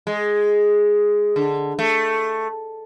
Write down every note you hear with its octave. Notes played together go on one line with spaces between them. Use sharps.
G#3
D3
A3